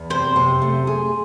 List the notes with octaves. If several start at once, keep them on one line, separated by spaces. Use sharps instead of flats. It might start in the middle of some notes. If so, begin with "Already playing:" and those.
Already playing: E2
C3 C5
C3
A3
G#4